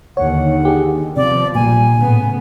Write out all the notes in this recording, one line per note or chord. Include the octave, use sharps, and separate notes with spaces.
D#2 D3 D#3 C#5 F#5
G4 G#4
C3 F3 B3 D5
A#1 A#2 G3 G#5
A2 C#3 B3